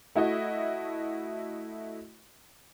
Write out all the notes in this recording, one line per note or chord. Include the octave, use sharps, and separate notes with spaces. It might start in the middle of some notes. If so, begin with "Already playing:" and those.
A3 E4 F#4 D#5